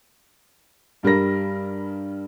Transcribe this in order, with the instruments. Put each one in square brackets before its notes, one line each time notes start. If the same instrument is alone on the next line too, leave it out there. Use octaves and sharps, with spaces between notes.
[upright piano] G2 G3 A#4 A#6